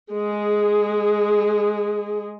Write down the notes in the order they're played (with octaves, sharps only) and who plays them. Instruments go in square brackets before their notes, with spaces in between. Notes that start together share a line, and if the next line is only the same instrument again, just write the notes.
[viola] G#3 G#4